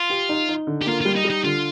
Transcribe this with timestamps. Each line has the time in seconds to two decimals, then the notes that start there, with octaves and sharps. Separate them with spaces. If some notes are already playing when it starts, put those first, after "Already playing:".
Already playing: F4
0.10 G4
0.29 D#4
0.49 D#4
0.67 D3
0.81 G4
0.87 A#3 F4
1.01 G3 F4
1.16 D#4
1.24 G3
1.30 D#4
1.44 D3 F4